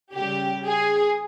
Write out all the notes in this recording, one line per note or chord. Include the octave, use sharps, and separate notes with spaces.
C#3 G3 G4
G#4